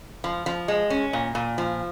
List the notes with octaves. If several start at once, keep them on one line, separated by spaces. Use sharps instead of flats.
F3
F3
G#3
C#4
A#2
A#2
F3